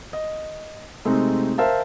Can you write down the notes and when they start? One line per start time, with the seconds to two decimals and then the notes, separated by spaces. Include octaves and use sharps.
0.13 D#5
1.05 C3 G#3 A3 C4 D#4
1.58 A#4 C5 E5 F5 A5